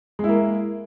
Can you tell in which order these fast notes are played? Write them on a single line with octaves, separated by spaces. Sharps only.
G#3 E4 A#3